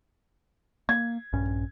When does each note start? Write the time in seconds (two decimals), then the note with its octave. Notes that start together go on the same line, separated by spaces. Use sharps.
0.89 A#3 G#6
1.33 A#1 G2 C#4